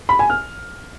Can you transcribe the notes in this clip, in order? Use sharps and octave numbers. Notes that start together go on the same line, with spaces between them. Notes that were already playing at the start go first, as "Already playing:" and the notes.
B5
G#5
F6